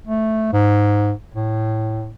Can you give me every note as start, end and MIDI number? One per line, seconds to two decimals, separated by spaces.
0.07 0.51 57
0.53 1.12 44
1.34 2.11 45